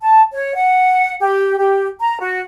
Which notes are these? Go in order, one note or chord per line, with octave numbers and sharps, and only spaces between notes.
A5
C#5
F#5
G4
G4
A#5
F#4